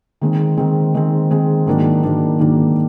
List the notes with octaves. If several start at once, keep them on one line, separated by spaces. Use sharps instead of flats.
D#3 G#3 C4
D#3 G#3 C4
D#3 G#3 C4
D#3 G#3 C4
G#2 D#3 F#3 A#3 D4
G#2 D#3 F#3 A#3 D4
G#2 D#3 F#3 A#3 D4